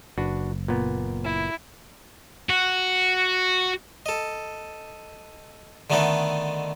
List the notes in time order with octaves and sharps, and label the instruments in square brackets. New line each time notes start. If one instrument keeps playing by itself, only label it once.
[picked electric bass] F#1 [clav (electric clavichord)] D4 F#4 B4
[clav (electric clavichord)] A#2 B3
[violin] E4
[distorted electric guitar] F#4
[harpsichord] A4 D#5
D3 D#3 A3 B3 D#4 D5